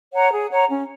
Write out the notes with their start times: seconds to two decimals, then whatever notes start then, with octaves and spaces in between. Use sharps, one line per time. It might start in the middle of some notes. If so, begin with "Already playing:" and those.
0.12 C#5 F#5 A#5
0.31 G#4
0.50 C#5 F#5 A#5
0.68 C#4